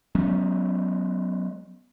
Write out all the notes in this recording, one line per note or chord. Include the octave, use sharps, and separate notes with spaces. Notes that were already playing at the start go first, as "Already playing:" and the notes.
F#3 G#3 B3 C#4